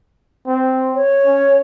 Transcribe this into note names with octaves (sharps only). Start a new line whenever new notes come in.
C4
C#5
C#4